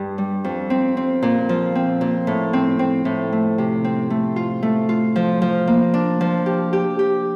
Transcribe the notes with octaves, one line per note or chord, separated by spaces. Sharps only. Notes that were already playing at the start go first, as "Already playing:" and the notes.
Already playing: G2 D4
G3
F2
C4
C4
A#2
F3
C4
A#2
A2
C4
C4
A2
A3
C3
C4
A3
F4
A3
F4
F3
F3
A#3
D4
F3
G4
G4
G4